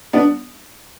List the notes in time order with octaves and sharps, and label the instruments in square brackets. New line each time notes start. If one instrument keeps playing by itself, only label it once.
[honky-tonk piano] B3 D4